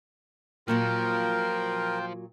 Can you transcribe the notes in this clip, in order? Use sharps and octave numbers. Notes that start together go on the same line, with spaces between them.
A#2 F3 F#3 A#3 F4 A#4 G5